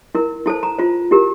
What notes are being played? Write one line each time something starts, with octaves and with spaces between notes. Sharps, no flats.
E4 A#4
E4 A4 C5 A5
A#5
F4 C5
E4 G4 A#4